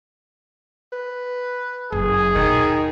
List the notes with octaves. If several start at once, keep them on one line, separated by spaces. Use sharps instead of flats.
B4
F#1 G#4
D#2 B2 D#3